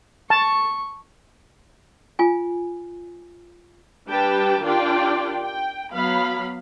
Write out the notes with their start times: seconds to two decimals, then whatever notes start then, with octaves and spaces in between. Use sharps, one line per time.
0.30 A5 C#6
2.19 F4 G#5
4.08 G3 D4 G4 B4 G5 A5
4.63 D#3 D4 F4 G4 D5 G5
5.42 G5
5.92 F#3 B3 F5 B5